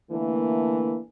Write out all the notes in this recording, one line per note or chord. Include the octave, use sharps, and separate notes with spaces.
D3 E3 A3 A#3